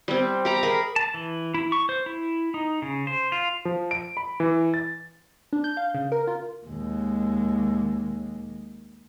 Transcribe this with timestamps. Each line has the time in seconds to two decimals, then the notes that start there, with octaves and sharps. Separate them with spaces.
0.08 G3 C4
0.45 G4 A#5 B5
0.63 G#4 A#4 B5
0.96 A5
1.14 E3
1.54 E4
1.72 C#6
1.89 C5
2.06 E4
2.54 D#4
2.82 C#3
3.07 C5
3.32 F4
3.65 F3
3.91 D7
4.17 B5
4.40 E3
4.74 A6
5.53 D4
5.64 G6
5.77 F5
5.95 C#3
6.12 A#4
6.27 F4
6.66 D#2 G#3